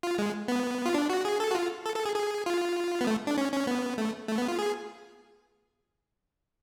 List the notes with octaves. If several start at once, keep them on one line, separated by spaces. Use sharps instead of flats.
F4
G#3
B3
F4
D4
F#4
G#4
A4
F#4
F4
A4
A4
G#4
G#4
F4
B3
A3
D4
C#4
C#4
B3
A3
A3
B3
F4
G#4